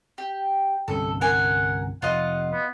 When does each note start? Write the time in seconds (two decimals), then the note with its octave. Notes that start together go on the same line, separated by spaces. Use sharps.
0.18 G4
0.88 G1 C2 C#4 A4
1.21 A#4 F#5 G#5
2.02 F1 F4 D#5 F#5
2.52 B3